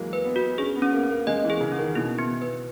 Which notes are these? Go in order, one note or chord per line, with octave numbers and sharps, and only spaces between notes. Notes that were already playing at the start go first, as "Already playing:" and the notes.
Already playing: E3 F#3 G#3 A#3
B4
B3
F#4
C#4 G#4
B3
C#4
A#3
C#4
A#3
G#3 D#5
E3
G#4
C#3
C#4
D#3
B2 E4
B3
B4